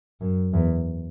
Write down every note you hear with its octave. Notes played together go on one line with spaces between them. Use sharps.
F#2
E2